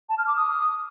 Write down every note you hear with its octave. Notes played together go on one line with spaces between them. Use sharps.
A5
F6
D6
D#6